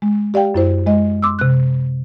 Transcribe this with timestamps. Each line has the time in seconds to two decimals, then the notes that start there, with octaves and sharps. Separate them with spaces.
0.02 G#3
0.34 G4 D5 F5 G5
0.54 F#2 E4 C5
0.86 G#3 D#5
1.22 C6 D6 E6
1.39 C3 F#6